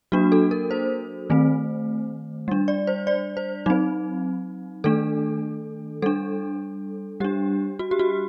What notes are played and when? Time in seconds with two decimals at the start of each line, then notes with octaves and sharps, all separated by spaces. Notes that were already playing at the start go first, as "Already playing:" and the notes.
0.12 F#3 A#3 D4 F#4
0.32 A4
0.51 A#4
0.71 C5
1.30 D#3 A3 C4
2.48 G3 D4
2.68 D5
2.87 C5
3.07 D5
3.37 C5
3.66 F#3 C4 D#4
4.84 D#3 A3 D4 A4
6.02 G3 D4 A4
7.20 G3 D4 G4
7.79 F#4
7.91 G4
7.99 F#4